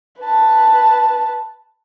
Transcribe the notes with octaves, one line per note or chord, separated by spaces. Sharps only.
B4 A5